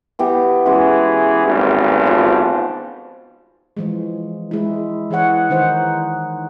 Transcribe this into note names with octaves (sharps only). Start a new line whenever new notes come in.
E3 B3 G4
E3 G#3 C#4 F#4 G#4
G#1 D2 G2
F3
E3 F3 G#3
G#3 E4
E3 G#4 C#5 F#5
D#3 D#4 C5 F#5